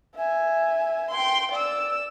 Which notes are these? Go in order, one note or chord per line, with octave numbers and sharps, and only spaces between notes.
E5 G#5
G5 C6
D5 E6